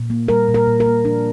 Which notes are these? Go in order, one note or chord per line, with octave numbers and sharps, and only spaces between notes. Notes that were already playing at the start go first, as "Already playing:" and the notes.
Already playing: A#2
A#3
G3 A#4
A#2
A#4
A#2
A#4
A#3
F3 D4